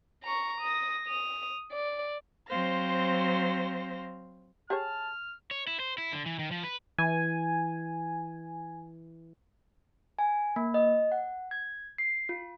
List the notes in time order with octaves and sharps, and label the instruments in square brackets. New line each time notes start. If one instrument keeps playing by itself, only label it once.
[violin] A#5 C#6
D#6 A#6
D#6 F7
D5
[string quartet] F#3 C4 C5 F5 A#6
[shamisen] G4 G#4 C#5 [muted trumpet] A5 [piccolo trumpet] F6
[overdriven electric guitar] C#5
E4
C5
E4
D3
E3
D#3
F3
B4
[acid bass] E3 [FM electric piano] G#5
[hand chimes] G#5
A#3
D#5
F#5
G#6
C7
F4